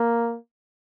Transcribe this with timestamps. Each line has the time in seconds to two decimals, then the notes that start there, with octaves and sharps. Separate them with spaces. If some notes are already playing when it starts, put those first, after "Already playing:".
Already playing: A#3